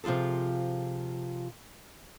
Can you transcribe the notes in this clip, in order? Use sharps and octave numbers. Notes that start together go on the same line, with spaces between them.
C3 F3 F4 G#4 A4